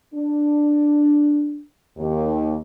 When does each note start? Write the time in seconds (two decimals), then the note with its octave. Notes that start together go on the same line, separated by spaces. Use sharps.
0.15 D4
1.97 D#2